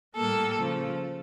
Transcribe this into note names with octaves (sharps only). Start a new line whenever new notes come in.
A2 G3 A#3 A4
C#3 F3